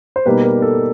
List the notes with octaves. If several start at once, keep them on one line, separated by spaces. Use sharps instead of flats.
C5
B2 G3 A#3 D#4 B4
A#4
A4